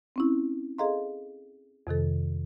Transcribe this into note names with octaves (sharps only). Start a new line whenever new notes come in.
C4 C#4 E4
G#4 A4 D#5 F5 A#5 C6
F2 C3 D#3 A4